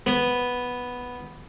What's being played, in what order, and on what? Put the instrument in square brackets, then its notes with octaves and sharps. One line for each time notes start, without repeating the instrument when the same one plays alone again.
[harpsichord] B3